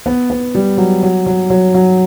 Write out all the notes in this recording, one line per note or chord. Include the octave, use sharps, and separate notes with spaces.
B3
B3
G3
F#3
F#3
F#3
F#3
F#3